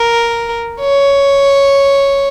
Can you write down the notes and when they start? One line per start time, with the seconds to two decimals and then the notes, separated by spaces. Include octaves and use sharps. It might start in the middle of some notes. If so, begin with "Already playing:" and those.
Already playing: A#4
0.80 C#5